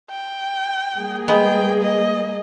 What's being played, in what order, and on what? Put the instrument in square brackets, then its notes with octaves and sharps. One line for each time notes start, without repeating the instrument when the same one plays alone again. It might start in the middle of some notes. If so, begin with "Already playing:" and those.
[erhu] G5
[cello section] G3 A#3 G#4
[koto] G#3 B3 [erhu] G5
[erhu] D#5